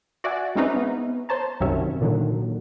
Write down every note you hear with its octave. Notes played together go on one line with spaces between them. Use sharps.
F#4 D5 E5 F#5 G#5
G#3 C4 C#4 D#4 B4 E5
B3
C5 C#5 A5 A#5
C2 F#2 C3 D#3 C#4 E5
A#2 D3 D#3 F#3